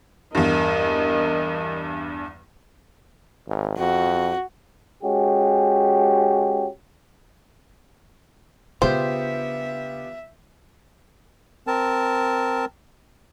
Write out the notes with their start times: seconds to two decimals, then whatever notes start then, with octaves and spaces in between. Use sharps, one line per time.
0.35 E2 G2 A#4 D#5
3.48 G#1
3.78 F2 F#4
5.03 G#3 C#4 F#4 G4
8.82 C#3 B3 D4 F4 G4 C5 E5
11.67 C4 A#4 A5